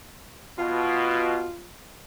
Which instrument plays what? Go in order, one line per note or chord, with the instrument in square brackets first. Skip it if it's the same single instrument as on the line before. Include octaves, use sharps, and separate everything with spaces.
[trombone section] B2 [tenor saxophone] F4